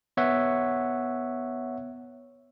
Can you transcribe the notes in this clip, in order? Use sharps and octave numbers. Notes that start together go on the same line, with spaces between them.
B3 C#5 E5 F#5